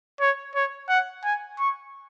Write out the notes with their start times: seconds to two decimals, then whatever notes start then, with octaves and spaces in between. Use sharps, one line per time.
0.21 C#5
0.55 C#5
0.89 F#5
1.24 G#5
1.59 C#6